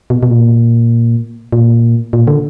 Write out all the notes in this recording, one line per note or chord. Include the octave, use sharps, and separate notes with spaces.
B2
B2
A#2
A#2
A#2
D3